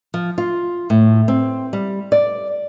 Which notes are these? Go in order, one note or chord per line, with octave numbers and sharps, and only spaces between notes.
F3
F4
A2
C4
G3
D5